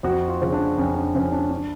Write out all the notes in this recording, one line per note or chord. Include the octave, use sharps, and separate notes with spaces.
F2 F#4
F4
C#3 F3
D4
F2 C#4
D4
C#3 F3 C#4
D4
D4